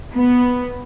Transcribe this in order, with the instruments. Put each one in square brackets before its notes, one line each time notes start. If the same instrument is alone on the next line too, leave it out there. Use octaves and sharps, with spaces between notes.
[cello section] B3